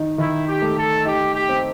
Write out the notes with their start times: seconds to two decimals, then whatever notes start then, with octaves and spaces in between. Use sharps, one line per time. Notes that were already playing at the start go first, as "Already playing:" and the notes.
Already playing: D#3 D#4
0.18 D#3 E4
0.47 G4
0.62 A3
0.77 A4
1.05 D#4 G4
1.34 G4
1.49 C4